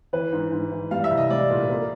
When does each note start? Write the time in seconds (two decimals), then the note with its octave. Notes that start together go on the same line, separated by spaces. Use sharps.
0.13 E3 B4
0.32 G#2
0.52 G#2
0.72 E3
0.91 G3 F5
1.04 E5
1.11 C2
1.17 D#5
1.30 G3 D5
1.50 A#2
1.69 A#3